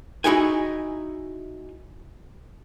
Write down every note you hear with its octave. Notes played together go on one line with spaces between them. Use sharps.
D#4 E4 F#4 G#4 G5 G#5